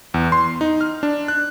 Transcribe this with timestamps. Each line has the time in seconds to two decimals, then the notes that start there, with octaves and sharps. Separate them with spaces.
0.14 E2
0.32 C6
0.61 D#4
0.81 F6
1.03 D4
1.28 F#6